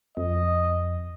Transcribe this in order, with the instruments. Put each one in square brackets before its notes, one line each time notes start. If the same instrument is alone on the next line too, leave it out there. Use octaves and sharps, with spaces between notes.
[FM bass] F2 [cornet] D#5